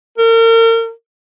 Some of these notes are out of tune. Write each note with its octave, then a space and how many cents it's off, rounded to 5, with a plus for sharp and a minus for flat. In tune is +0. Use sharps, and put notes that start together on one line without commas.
A#4 -35